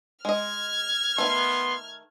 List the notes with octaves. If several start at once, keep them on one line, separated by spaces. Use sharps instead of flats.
G#3 D#5 F6 G#6
D#3 F3 A3 B3 C6